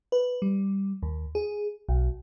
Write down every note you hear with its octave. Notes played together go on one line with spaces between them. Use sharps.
B4
G3
D#2
G#4
B1